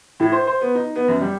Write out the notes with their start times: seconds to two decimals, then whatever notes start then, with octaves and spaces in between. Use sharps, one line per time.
0.20 A2
0.32 C5
0.47 C5
0.61 B3
0.75 D#4
0.96 B3
1.08 F#2
1.21 G3